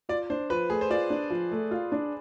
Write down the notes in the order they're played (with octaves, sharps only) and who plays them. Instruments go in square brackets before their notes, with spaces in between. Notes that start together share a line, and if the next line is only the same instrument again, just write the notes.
[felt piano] F4 [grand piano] D5
[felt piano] D4 [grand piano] C5
[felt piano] F3 [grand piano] B4
[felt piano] A3 [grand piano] G#4
[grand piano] C5
[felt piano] F4 [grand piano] D5
[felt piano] D4
F3
A3
F4
D4